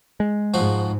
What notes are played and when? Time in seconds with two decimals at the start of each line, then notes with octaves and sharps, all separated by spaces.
0.20 G#3
0.54 G#2 F3 F#4 C5